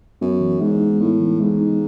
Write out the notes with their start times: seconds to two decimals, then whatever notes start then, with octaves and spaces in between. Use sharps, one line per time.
0.21 F#2 B3
0.41 E3
0.61 G#2 G#3
0.80 D#4
1.00 A2 B3
1.20 E3
1.40 G#2 G#3
1.61 D#4